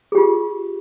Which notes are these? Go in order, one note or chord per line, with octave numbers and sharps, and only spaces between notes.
F4 G4 G#4